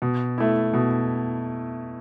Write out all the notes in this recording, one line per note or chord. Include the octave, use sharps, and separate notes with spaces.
B2
A3 E4
B2